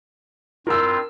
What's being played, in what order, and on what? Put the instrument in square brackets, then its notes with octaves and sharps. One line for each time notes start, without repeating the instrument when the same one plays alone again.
[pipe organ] G2 C4 F4 [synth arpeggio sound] E4 [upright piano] A#4 E6